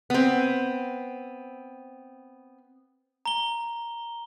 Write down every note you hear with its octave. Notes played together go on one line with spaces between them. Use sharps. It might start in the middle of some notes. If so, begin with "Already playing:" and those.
B3 C4
A#5 G7